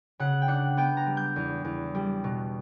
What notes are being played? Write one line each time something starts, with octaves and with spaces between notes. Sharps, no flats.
C#3 F#5
G5
D4 F#5
B3 G5
A#5
G3
G6
E2
E2
G3
B2